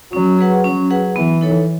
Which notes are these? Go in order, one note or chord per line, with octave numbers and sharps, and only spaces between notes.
F#3 C#4
G#4 B4 F#5
F#3 C#4
G#4 B4 F#5
E3 B3
D#4 A4 C#5